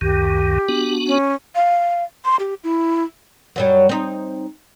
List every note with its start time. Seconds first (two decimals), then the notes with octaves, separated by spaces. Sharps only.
0.01 C#2 F#2 D#3 G4
0.69 B3 D4 F#4
1.07 C#4
1.55 F5
2.25 C6
2.40 G4
2.64 E4
3.56 F#2 F#3 G3
3.89 C4 D#4